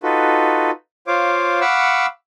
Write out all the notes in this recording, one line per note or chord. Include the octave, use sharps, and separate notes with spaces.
D#4 F4 F#4 A4 B4
F4 C5 C#5 F5 D6
F5 F#5 B5 C#6 D6 E6